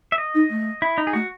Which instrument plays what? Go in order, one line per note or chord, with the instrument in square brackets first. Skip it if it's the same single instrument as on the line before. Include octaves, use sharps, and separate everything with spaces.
[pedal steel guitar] E5
D#5
[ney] D#4
A3
[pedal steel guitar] E4
D#4
G#4
[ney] A3 [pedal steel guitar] F#4